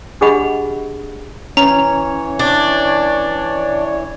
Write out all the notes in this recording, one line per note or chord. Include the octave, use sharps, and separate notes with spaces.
D4 G4 G#4 D#5 F#5 B5
E3 C#4 C#5 A#5
D4